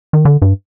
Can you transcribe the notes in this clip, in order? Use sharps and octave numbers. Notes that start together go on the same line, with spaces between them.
D#3
D3
G2